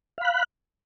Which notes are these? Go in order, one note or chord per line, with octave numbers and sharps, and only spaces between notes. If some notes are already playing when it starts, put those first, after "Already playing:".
F5 B5 F#6